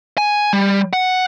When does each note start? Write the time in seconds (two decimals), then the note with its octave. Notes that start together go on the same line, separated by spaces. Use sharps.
0.18 G#5
0.53 G3
0.93 F#5